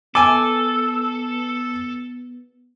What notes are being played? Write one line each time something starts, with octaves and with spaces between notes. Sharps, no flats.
B3 A4 G#5 D6